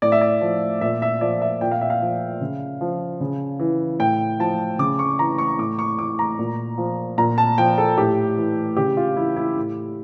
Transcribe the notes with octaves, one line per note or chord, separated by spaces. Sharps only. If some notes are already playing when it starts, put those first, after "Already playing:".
A2 D5
E5
D5
F3
A#2 E5
E5
F3 D5
E5
A#2 G5
F5
E5
F5
F3
C#3
F3
C#3
E3
A2 G5
F3 A5
C#3 D6
C#6
E3 A#5
C#6
A2 D6
C#6
E3 D6
A#5
A#2
F3
A#2 A#5
A5
F3 G5
A4
A2 G4
E3
C#3 G4
F4
E3 E4
E4
A2